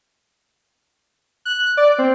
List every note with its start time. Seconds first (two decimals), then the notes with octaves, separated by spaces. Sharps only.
1.45 F#6
1.77 D5
1.99 C4